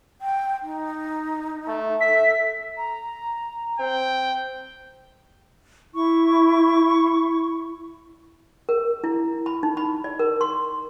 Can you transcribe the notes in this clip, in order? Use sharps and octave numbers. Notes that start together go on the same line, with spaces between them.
G5
D#4
A3
A4 E5 B6
A#5
C4 G5
E4 C#6
A#4
E4
B5
D#4
B5
D5
A#4
C6